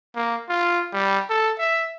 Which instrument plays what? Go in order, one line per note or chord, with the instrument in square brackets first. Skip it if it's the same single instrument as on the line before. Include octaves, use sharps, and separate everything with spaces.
[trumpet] A#3
F4
G3
A4
E5